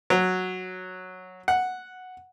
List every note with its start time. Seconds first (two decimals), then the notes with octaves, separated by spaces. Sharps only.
0.10 F#3
1.48 F#5